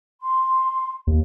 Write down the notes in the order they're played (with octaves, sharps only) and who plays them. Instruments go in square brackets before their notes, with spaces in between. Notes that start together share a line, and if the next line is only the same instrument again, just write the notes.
[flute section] C6
[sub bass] D#2